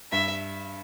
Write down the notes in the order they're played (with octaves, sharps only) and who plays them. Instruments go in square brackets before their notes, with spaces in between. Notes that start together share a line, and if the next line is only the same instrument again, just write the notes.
[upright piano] G2 [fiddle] E5